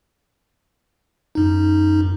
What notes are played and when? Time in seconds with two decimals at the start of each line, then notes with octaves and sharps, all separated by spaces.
1.35 F#2 D#4